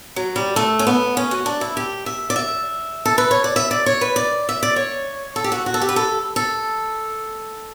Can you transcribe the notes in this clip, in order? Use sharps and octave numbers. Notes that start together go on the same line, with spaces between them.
F#3
G3
A3
C#4
B3
C#4
F#4
D4
E4
G4
E5
D5
E5
A4
B4
C#5
D5
E5
D5
C#5
B4
D5
E5
D5
C#5
A4
G4
F#4
F#4
A4
G4
B4
A4
A4